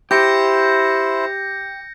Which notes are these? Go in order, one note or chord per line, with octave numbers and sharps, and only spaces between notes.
E4 G4 C5 G6 A#6 C#7